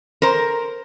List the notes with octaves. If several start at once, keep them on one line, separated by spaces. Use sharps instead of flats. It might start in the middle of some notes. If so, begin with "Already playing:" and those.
A#4 C5